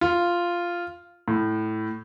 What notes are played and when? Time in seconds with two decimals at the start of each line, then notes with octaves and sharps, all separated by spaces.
0.01 F4
1.28 A2